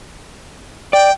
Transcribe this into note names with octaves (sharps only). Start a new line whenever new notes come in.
D5 G5